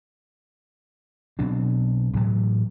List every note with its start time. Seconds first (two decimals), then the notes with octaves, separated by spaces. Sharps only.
1.39 B2 F#3 C4 D4
2.13 A1 A2 F#3 A3